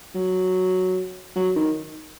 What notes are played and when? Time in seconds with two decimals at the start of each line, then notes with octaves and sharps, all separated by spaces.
0.15 F#3
1.36 F#3
1.56 D#3